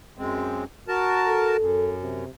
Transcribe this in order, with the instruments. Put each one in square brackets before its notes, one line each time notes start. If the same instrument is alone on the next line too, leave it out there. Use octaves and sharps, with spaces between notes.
[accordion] F#2 G#3 C4
F#4 A#4 A5
[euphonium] A4
[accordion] F#2
[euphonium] C3